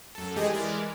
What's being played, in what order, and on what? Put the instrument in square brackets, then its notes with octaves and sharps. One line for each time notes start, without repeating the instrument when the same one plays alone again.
[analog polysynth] F#2 A4
E3 G#3 G4 G#4 D#5
E3 G#3 A#4 D5